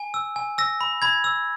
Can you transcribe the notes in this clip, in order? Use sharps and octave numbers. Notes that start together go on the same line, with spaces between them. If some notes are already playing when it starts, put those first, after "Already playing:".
Already playing: G#5
E6
G#5
E6 A#6
B5
B5 G#6
E6